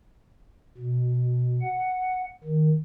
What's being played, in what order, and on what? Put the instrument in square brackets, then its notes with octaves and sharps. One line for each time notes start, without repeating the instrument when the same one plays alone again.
[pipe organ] B2
F#5
D#3